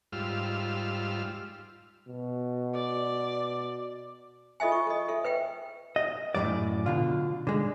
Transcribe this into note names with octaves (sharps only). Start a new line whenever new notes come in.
G#2 G3 F4 E6 F6
B2
D5
F4 A4 D#5 E5 G#5
C#6
A4 D#5
A4 E5
B4 E5 G5
D#5
F#2 A2 E3 F#3 D5
B2 D3 F4
D3 G#3